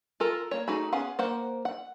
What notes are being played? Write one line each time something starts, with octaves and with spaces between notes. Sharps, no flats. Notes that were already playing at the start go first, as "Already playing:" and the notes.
F4 A4 A#4
A#3 C#5
A3 D#4 F#4 G#4 B5
B3 C#4 G#4 F5 F#5
A#3 A#4 C5 F#5
F#5